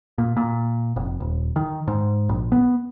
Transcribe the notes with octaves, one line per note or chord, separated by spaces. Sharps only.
A#2
A#2
F1
D#1
D#3
G#2
A#1
B3